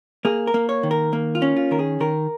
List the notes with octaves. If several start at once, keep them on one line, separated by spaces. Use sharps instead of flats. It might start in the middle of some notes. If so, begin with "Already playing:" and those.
A#3 G#4
A#4
A#3
C#5
D#3
A#4
A#3
F4
C#4
F4
D#3 A#4
G#4
D#3 A#4